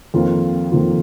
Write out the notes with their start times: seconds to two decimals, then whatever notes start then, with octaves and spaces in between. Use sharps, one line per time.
0.14 F2 D#3 A#3 F4
0.72 F2 D#3 A#3 F4